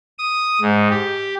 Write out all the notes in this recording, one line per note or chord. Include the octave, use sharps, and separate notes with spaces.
D#6
G#2
G4